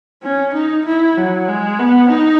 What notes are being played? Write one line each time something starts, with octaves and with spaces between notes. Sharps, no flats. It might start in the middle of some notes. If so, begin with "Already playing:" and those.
C#4
D#4
E4
F#3
G#3
B3
D#4